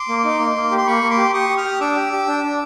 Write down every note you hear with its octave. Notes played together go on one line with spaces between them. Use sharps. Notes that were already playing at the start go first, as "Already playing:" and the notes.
Already playing: C6 D6
A#3
D#4
A#3
A#3
G4
C6
A#3 B5 C#6
A#3
C6 D6
G4
G4 C#6 D#6
G4
D#6 F6
G4
D4 D6 E6
G4
G4
D4
D4